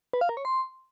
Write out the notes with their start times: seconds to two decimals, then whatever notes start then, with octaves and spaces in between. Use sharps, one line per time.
0.13 B4
0.21 F5
0.29 A#4
0.37 C#5
0.45 C6